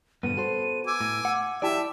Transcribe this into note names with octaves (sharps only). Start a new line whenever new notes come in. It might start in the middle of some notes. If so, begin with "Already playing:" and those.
G2 A#2 D3 B3 D#7
F#4 A4 C5
G#5 D6 E6
A2
F#5
E4 G4 D5 E5 G5 A5